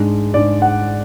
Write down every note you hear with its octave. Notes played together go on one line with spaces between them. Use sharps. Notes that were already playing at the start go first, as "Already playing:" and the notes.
Already playing: G#2 G#3 D4
G#2 G#3 D4 D5
F#5